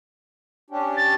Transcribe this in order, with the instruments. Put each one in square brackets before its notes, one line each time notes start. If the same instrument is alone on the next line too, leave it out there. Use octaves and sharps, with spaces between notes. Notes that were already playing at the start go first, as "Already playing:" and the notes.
[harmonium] C#4 D4 G4
[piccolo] A6